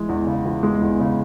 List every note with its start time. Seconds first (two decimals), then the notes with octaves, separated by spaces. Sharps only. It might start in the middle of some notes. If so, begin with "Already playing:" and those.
Already playing: E3 G#3
0.09 E2
0.27 C#3
0.45 E3
0.63 G#3
0.81 E2
1.00 C#3